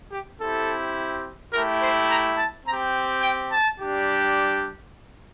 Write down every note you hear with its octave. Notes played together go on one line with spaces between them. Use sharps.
G4
C4 E4 G4 A4
A3 E4 G4 A#4
C5
A#5
A5
C4 A#5
G4
G5
A5
G3 D4 G4